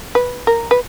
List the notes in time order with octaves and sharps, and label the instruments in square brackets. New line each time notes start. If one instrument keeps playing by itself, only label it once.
[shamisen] B4
A#4
B4